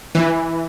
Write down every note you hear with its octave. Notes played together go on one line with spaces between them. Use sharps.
E3